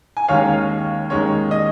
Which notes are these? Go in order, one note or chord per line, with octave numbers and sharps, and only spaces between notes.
G#5
D#2 D#3 G#3 C#4 C#5 F5
D#2 D#3 G#3 C#4 C#5
D#5